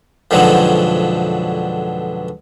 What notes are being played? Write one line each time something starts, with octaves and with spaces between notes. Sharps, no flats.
F2 G#2 B2 D3 F3 F#3